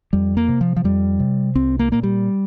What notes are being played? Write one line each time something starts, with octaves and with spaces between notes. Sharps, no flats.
F2 G3
A#3
C3
F3
F3
F2 G3
C3
C2 C4
A#3
A#2 A#3
G3